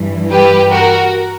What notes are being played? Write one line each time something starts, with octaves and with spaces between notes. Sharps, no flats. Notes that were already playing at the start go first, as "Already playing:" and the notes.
Already playing: G2 E3
G4 B4
F#4 A#4